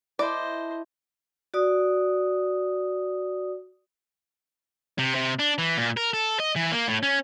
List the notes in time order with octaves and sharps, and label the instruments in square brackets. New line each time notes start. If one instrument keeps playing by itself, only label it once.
[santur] E4 A4 [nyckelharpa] C5 D#5 [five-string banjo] D5
[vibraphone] F#4 D5 D#6
[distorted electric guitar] C3
C3
D4
E3
A#2
A#4
A4
D#5
E3
A#3
A2
C#4